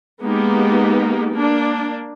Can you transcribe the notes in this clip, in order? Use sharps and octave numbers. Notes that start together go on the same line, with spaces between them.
G#3 A#3 B3 D#4 G4
A#3 D4